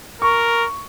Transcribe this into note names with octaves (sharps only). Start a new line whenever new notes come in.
A#4 C#6